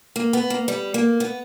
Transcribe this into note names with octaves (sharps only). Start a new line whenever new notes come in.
A#3
B3
A#3
G3
A#3
B3